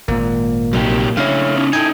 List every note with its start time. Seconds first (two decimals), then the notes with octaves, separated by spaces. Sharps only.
0.08 G#1 A#2 A#3
0.73 A#1 F#2 C3 F#3 D#4 G4
1.17 C#3 A3 D4 E4 C#5 F5
1.56 C#4 D#4
1.73 D#4 E4 A4 G5 G#5